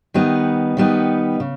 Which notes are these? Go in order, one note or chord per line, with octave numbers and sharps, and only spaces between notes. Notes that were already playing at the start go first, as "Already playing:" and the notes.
D#3 G3 B3 D#4
D#3 G3 B3 D#4
C#3